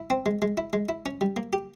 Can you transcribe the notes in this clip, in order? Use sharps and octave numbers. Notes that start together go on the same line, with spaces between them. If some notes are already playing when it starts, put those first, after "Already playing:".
Already playing: E4
C4
G#3
G#3
E4
G#3
E4
C#4
G3
A#3
G4